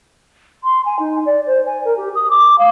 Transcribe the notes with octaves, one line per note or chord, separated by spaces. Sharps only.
C6
G#5
D#4
D5
C5
G#5
A#4
G4
D#6
D6
F5